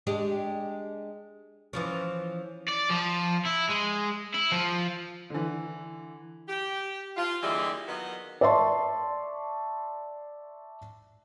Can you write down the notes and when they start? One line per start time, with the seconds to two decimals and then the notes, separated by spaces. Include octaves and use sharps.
0.07 G#3 D4 G4
1.73 E3 F3 C#4
2.68 D5
2.90 F3
3.45 E4
3.69 G#3
4.34 E4
4.52 F3
5.30 D3 E3
6.48 G4
7.17 F4
7.43 D3 E3 G3 G#3 A#3 E4
7.88 D#3 F#3 B3 F4 D#5
8.41 D5 E5 A5 C6 C#6